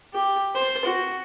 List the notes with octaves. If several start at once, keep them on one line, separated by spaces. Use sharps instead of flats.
G4
C5
F#4